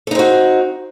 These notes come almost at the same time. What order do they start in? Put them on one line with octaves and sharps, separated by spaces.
A4 D#4 C4 F#4